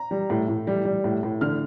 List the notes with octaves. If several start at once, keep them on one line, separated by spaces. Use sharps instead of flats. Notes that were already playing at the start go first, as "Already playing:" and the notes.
Already playing: A#5
G3
A2
A2
G3
G3
A2
A2
D3 F6